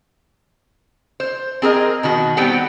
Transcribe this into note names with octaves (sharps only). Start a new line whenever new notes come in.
C5
C4 G#4 A#4 D#5
B2 D#3 F#4
G3 B3 C4 G4 F#5 G5